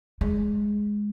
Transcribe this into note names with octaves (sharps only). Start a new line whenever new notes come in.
G#3